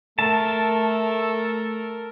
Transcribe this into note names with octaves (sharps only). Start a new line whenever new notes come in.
A3 A4 A#4 A5